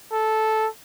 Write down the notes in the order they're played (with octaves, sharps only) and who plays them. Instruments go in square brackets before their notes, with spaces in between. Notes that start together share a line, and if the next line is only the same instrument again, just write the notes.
[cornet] A4